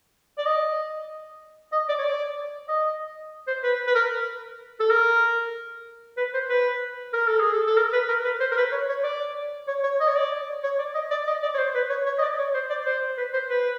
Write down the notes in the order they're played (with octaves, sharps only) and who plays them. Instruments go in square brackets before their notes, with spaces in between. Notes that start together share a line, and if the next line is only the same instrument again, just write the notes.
[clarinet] D5
D#5
D#5
D5
C#5
D5
D#5
C5
B4
B4
A#4
A4
A#4
B4
C5
B4
A#4
A4
G#4
A4
A4
A#4
B4
A#4
B4
C5
A#4
B4
C#5
C#5
D5
C#5
C#5
D#5
C#5
D5
C#5
D5
D#5
D5
D#5
D5
C#5
C5
B4
C#5
C#5
D#5
D5
C#5
C5
D5
C5
B4
C5
B4